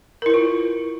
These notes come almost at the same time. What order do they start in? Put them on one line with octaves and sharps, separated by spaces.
A#4 E4 B4 F4